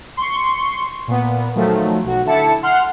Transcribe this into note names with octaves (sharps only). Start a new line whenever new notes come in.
C6 C#6
A#2 B3
D#3 F3 F#3 A3
B1 F#4
D3 E4 A5 C#7
F#5 C6 F6